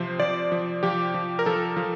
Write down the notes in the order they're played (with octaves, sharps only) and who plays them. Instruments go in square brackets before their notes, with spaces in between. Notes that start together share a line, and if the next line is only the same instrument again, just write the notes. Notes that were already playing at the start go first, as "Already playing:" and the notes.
Already playing: [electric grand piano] C3 F3 C5
F3 D5
F3
F3 G4
F3
A#4
F3 A4
F3